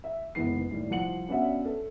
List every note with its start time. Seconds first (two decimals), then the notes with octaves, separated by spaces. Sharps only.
0.04 E5
0.35 F#1 B1 G#2 E3 B3 C7
0.69 D#2 A2 G3
0.90 C2 F3 F#5 C#7 F#7
1.29 B3 C#4 D4 F#4 E5 F#5
1.65 A4